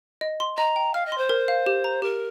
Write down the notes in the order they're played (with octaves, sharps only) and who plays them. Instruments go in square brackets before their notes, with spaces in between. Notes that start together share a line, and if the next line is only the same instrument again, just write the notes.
[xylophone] D#5
C6
[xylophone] D#5 [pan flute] A#5
[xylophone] G5
[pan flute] F5 [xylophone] F6
[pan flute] D#5
[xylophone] C6
[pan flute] C5
[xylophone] A#4
F5
G4
A#5
[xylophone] G4 [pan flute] A#4